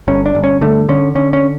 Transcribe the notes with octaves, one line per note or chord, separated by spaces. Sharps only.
G1 C#4
D4
G1
C#4
D3 A3
D3 C#4
D3 C#4
C#4